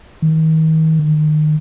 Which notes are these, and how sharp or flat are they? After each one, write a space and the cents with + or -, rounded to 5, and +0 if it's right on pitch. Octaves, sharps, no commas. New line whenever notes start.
D#3 +35
D#3 -30